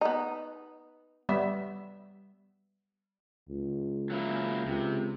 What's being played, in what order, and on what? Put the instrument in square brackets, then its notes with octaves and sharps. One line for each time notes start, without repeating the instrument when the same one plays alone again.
[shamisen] B3 D#4
[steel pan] G3 B3 E5
[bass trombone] C#2
[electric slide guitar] F#3 A#3 E4
[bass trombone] C#2 [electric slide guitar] C3